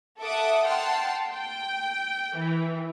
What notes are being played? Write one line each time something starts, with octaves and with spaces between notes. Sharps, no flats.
A4 E5 F#5 D6 D#6
F#5 G5 A5 C6 F6
G5
E3